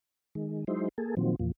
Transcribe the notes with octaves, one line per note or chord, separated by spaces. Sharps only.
D#3 G#3
F#3 G#3 D#4 E4 C5
A#3 G#4 A4
A#2 D#3 F3 F#3 C4
E2 A#2 F3